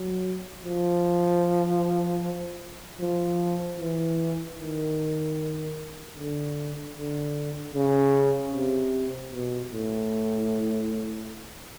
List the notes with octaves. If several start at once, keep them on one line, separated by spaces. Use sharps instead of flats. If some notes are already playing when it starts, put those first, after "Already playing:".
Already playing: F#3
F3
F3
E3
D#3
D3
D3
C#3
C3
B2
A2